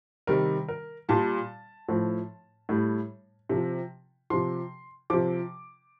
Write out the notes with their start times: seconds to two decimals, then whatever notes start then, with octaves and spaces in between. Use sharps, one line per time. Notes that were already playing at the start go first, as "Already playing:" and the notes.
0.27 C3 D#3 G3 A#4
0.69 A#4
1.09 A#2 G3 A5
1.89 A2 F3
2.69 A2 G3
3.49 C3 F3
4.30 C3 F3 C6
5.10 C3 F3 D6